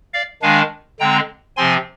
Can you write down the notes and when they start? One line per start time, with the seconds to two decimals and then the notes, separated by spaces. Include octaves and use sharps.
0.14 D5 F5
0.42 D#3 G#3 D4 F5 G#5
1.00 D3 G#3 C4 G5 A#5
1.56 C3 F3 C4 G#5 C6